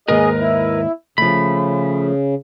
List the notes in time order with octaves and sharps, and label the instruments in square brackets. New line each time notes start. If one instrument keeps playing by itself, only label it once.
[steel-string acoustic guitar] D#2 G#2 [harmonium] G#4 D#5 [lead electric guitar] A#4 B4
[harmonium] E4
[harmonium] C#3 [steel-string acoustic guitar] F3 A3 [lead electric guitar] B5